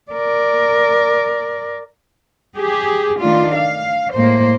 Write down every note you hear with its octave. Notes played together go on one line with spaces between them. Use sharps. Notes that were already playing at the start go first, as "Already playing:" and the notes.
A#4 D5
G4 G#4
D#3 A3 D4 F4
F5
A2 G#3 A#3 C5